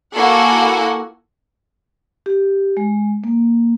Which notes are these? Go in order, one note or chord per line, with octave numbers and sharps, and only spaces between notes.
A#3 E4 F#4 A4 F#5 G#5
G4
G#3
A#3